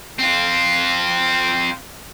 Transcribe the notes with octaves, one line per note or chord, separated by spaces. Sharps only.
C4 F4